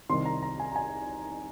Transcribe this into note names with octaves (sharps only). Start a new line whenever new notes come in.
C2 C3 D#3 C6
A#5
A#5
G#5
A#5
G#5